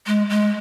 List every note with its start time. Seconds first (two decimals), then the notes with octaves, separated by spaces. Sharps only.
0.07 G#3
0.30 G#3